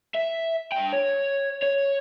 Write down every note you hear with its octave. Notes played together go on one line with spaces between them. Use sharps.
E5
D4 G5
C#5
C#5